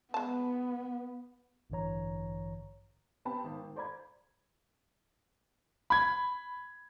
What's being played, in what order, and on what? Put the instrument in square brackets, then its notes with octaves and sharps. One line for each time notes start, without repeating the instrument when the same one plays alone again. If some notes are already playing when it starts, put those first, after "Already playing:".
[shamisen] G#3 A5 [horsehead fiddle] B3
[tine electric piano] A1 G2 D3 E3 C#5 A#5
[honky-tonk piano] B3 C4 G4 A5 B5
G#1
G#1
A4 C5 D5 A#5 B5 G#6
[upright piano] B5 G#6